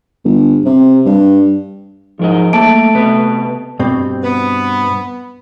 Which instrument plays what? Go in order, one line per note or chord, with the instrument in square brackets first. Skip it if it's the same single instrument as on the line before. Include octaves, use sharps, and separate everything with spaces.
[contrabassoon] G1
C3
G2
[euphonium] G#2 [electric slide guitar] F3 A#4 D#5
[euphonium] A3 [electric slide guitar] A#3 E5 [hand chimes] A5 D7
[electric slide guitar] C3 B3 B4
[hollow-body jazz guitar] G2 B2 C4
[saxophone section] B3